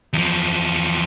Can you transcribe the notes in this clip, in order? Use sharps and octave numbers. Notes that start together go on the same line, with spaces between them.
E2 F3